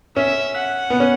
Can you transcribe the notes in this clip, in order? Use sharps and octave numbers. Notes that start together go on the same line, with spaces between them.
C#4 E5
F#5
B3
C#4